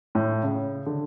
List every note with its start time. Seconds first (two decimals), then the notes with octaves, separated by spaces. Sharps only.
0.15 A2
0.43 C#3
0.86 D3